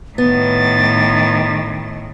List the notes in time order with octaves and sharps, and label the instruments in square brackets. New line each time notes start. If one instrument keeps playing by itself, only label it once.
[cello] A2 D#3 [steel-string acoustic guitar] B3 [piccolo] A6